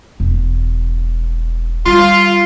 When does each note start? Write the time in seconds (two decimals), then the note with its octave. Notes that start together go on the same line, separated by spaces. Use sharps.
0.20 E1
1.86 G3 F4